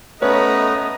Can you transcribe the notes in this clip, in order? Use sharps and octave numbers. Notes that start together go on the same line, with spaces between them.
A3 B3 C#4 B4 D#5 A#5